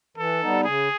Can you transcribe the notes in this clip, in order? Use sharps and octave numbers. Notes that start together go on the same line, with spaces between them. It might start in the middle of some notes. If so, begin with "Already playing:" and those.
E3 A4
G3 B3 D#4
C#3 G#4